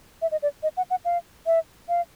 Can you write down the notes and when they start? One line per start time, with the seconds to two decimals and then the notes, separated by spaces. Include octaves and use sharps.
0.22 E5
0.32 D#5
0.43 D5
0.63 D#5
0.77 F#5
0.90 F#5
1.05 F5
1.46 E5
1.89 F5